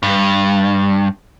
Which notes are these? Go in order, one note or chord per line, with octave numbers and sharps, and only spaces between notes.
G2